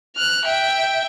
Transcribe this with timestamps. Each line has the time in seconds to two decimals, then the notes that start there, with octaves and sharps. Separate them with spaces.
0.16 F6 F#6
0.45 E5 G5